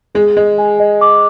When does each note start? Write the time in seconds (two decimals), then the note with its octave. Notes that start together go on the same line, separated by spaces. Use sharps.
0.15 G#3 G#4
0.36 G#3 D#5
0.58 G#5
0.80 D#5
1.01 D6